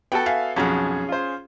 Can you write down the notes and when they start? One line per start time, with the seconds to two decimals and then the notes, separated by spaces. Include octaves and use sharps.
0.12 B3 F#4 A4 G5
0.26 E5 F5 G#5
0.56 B1 F2 C#4 F#4 G#4
1.09 F4 C5